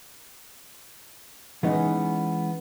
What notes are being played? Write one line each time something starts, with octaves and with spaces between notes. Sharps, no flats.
E3 G#3 B3 C#4 D#4 D#5